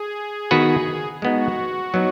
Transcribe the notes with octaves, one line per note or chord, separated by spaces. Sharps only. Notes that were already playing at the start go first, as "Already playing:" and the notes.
Already playing: G#4
D#3 B3 F#4 B4
G#3 B3 D#4 F#4
F#3 B3 D#4